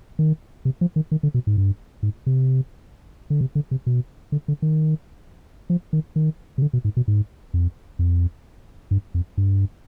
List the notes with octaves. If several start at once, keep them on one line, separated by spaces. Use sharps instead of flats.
D#3
C3
F3
D#3
D#3
D3
B2
G#2
G2
G#2
C3
D3
C3
D3
C3
B2
D3
D3
D#3
F3
D#3
D#3
C3
D3
B2
G#2
B2
G#2
F2
F2
G2
F2
G2